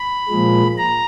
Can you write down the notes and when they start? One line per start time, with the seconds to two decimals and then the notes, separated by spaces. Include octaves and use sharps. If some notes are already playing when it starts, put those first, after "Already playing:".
Already playing: B5
0.29 A#2 F3 G#3
0.78 A#5